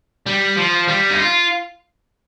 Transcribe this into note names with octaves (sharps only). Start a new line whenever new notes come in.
G3
F3
G3
D#4
F4